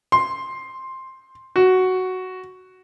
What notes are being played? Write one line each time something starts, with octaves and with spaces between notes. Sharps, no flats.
C6
F#4